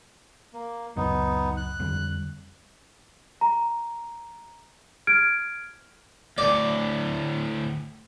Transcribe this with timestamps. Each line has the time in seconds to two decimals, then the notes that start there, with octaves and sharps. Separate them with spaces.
0.54 A#3
0.96 C#2 F#2 B3 D#4
1.57 F#6
1.80 F2 D3 G3
3.41 A#5
5.07 F6 G#6 D7
6.38 D2 A2 D5